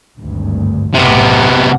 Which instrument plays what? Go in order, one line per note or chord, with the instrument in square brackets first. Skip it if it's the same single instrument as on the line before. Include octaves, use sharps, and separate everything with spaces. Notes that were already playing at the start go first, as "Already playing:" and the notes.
[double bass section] G#1 D2 G2
[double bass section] B1 F#2 A2 [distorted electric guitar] C3 B3